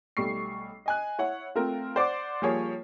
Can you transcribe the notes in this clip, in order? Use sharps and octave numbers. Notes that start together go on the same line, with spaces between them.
B1 G3 A3 C#6 C7
D#5 G#5 F#6
E4 C#5 F#5
A3 C4 F4 A#4
C5 D5 F#5 D6
F3 G3 A#3 G#4 C#5